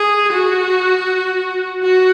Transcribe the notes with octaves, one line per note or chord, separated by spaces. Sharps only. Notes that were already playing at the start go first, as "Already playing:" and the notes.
Already playing: G#4
F#4
F#4